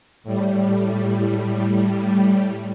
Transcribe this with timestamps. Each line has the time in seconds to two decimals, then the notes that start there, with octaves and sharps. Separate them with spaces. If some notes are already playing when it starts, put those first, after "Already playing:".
0.24 A2 G3